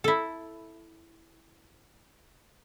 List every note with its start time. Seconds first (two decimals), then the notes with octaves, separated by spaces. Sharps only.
0.04 E4 A4